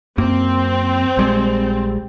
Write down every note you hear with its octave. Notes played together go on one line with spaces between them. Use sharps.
F#2 A#3 C4
A#1 G3 G#3